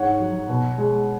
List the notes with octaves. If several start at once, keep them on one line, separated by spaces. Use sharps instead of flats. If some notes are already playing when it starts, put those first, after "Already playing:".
Already playing: G#2 C#5 F#5
F#3
B2
G#3